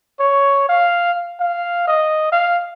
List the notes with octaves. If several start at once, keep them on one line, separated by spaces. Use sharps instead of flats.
C#5
F5
F5
D#5
F5